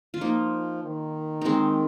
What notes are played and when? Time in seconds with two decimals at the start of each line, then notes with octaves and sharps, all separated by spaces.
0.14 F4
0.21 F3 A#3 D#4
0.84 D#3
1.41 G#3 C4 D#4